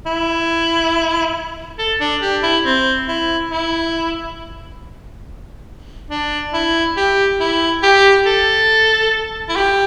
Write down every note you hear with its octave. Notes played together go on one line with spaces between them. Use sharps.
E4
A4
D4
G4
E4
C4
E4
E4
D4
E4
G4
E4
G4
A4
E4
G4